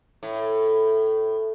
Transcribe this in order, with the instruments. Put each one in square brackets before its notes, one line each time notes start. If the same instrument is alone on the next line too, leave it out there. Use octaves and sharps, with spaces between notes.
[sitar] A2